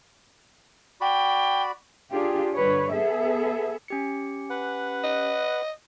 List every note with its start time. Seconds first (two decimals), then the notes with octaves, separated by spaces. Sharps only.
1.01 F#4 D5 G5 B5
2.12 D4 F4 G4 G#4
2.56 G2 D3 B4 C#5
2.92 B3 G#4 A4 E5
3.88 C#4 G4 C#7
4.50 B4 F#5
5.04 D#5